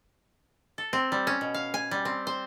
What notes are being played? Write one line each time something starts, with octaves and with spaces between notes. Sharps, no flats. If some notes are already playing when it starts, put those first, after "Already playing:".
A4
C4
G3
C#4
B2
F5
G#5
G3
C4
C5